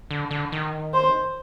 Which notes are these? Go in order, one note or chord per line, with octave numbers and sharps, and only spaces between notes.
D3
D3
D#3
C5